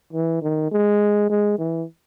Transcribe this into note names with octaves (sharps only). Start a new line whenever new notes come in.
E3
D#3
G#3
G#3
E3